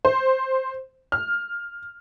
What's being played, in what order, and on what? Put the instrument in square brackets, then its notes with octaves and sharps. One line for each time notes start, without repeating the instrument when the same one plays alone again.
[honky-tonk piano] C5
F6